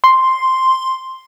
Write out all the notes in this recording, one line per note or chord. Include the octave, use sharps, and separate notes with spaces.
C6